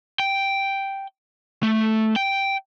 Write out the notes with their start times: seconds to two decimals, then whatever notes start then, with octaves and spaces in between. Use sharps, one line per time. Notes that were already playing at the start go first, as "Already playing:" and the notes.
0.20 G5
1.63 A3
2.16 G5